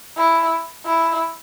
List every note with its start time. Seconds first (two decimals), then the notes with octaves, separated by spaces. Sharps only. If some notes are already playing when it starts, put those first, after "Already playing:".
0.16 E4
0.85 E4